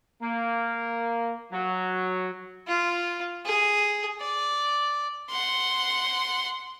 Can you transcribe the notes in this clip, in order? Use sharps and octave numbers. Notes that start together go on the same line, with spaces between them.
A#3
F#3
F4
G#4
D5
F#5 C6